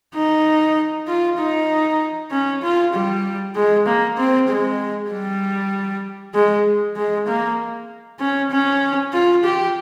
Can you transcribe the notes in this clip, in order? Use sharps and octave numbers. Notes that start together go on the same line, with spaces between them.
D#4
F4
D#4
C#4
F4
G3
G#3
A#3
C4
G#3
G3
G#3
G#3
A#3
C#4
C#4
F4
G4